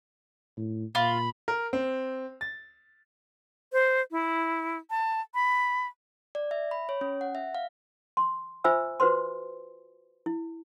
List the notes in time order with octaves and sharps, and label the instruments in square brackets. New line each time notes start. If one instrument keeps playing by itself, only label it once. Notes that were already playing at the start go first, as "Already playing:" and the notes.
[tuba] A2
[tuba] A#2 [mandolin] F4 [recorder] B5
[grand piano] A#4
C4
A6
[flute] C5
E4
A5
B5
[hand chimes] D5
E5
B5
C#5
C#4
F#5
E5
F5
[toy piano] C6
F4 C5 E5 G#5 B5 E6
F4 F#4 B4 C5 C6
E4